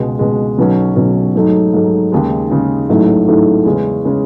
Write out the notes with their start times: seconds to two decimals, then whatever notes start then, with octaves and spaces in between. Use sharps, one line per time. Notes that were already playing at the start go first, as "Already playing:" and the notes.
Already playing: C#2 B2 G#3
0.19 C#2 B2 G#3
0.58 B1 B2 F#3 C#4
0.96 B1 B2 F#3 C#4
1.35 G#2 F#3 A3 D#4
1.73 G#2 F#3 A3 D#4
2.12 D#2 C#3 G#3
2.50 D#2 C#3 G#3
2.89 A1 G#2 F#3 A3 E4
3.27 A1 G#2 F#3 A3 E4
3.65 E2 C#3 G#3 C#4
4.05 C#3 G#3 C#4